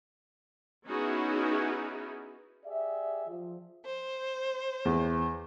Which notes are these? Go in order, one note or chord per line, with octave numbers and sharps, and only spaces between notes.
B3 C#4 D#4 E4 F#4 G#4
G4 G#4 D5 E5
F3
C5
E2